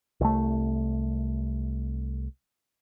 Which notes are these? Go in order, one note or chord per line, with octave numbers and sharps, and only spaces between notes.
C2 A3